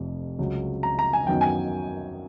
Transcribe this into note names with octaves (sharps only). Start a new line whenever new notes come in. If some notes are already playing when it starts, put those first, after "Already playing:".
Already playing: F1 F2 C3
C#2 C#3 F#3
A#5
A#5
G#5
F#2 D#3 F#3 B3 D#4 G5
G#5